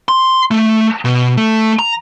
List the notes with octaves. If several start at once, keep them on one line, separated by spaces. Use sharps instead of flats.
C6
A3
B2
A3
A#5